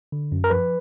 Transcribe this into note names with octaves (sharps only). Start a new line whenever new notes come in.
D3
F#2
A#4
F3 B4